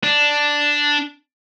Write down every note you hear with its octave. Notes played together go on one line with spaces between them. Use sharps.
D4